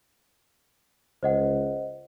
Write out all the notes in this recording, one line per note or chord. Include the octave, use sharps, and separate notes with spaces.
C#2 C5 D#5 F#5